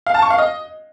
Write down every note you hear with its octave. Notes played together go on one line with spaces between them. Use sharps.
F5
A5
C#6
F5
D#5